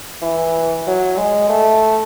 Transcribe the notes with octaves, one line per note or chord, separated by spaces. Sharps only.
E3
F#3
G#3
A3